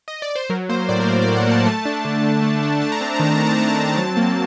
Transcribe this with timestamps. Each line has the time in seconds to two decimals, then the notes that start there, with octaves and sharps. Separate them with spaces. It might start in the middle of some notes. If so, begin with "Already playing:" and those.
0.08 D#5
0.22 D5
0.35 C5
0.50 F#3 A#4
0.69 A#3 C5
0.89 A2 D5
1.00 A#4
1.08 A2 C5
1.22 D5
1.27 F#3
1.36 F#5
1.47 A#3 A5
1.66 A3 A5
1.85 D4
2.05 D3
2.23 D3
2.42 A3
2.63 D4
2.82 A3 A5
2.92 A#5
3.01 C4 A5
3.14 A#5
3.20 D#3 A5
3.35 D#3 A#5
3.46 A5
3.57 A3 A#5
3.68 A5
3.78 C4
3.97 F#3 A5
4.17 A#3